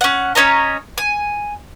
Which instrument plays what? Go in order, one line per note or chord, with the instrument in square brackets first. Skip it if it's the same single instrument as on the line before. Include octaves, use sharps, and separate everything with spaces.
[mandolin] C#4 F#5
C#4 C#5 D#5 A#5
G#5